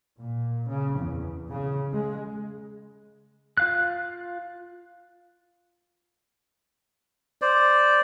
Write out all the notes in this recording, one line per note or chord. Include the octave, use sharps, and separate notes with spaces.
A#2
C#3
E2
C#3
G#3
F4 F5 F#6
C5 D5